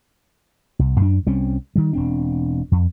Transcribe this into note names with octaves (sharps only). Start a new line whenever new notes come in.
C2
F#2 D4
C2 G3 C4 C#4
D#3 G3
E1 C4 D4
F2